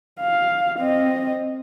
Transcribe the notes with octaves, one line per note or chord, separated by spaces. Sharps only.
F5
C4 D#5